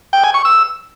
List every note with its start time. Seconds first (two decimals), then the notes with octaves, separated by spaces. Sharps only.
0.13 G5
0.24 G#5
0.34 C#6
0.45 E6